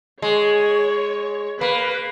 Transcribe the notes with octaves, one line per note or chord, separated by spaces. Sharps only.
G#3 C#5
A#3 B4